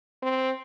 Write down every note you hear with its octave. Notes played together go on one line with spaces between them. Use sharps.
C4